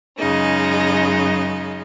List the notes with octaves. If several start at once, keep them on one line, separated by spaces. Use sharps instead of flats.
F#2 C#3 G#3 D#4